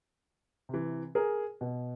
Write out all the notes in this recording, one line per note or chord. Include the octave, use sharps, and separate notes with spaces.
C3 E3
G#4 A#4
B2